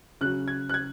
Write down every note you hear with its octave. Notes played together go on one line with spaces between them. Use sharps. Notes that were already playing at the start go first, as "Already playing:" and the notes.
C#3 F#3 F#6
G#6
F#6
G#6